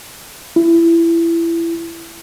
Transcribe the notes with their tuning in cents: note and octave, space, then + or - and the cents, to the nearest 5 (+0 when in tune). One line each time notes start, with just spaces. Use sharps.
E4 +20